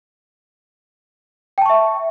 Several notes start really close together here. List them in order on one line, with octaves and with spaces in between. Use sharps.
G5 A5 C#6 E5